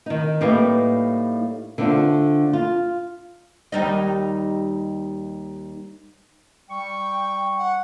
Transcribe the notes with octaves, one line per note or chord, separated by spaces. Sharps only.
D#3 D#4
A2 G3 A#3 D#4 B4 G5
D3 A3 C4 D4 F4
F4
D#2 G3 D#4
G3 G5 C#6
F#5